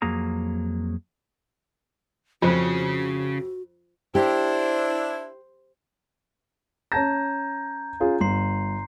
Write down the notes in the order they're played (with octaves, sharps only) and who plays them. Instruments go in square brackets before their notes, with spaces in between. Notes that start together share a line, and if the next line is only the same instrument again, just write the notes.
[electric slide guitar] F2 F#3 A#3 G#4 A#5
[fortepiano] F2 [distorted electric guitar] C#3 C#4 [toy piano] F4 C5 [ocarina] F#4
[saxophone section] D4 E4 [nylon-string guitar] G4 [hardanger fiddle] C5
[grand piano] C#4 A5 A#6 [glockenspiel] A#5 G6 G#6
[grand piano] C#4 F4 G#4
[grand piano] G1 [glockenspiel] A#5 C6 C7